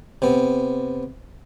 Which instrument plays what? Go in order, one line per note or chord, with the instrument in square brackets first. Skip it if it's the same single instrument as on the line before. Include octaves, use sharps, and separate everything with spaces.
[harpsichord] C3 B3